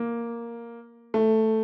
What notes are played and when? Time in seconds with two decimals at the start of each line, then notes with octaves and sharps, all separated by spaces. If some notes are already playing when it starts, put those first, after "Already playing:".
Already playing: A#3
1.14 A3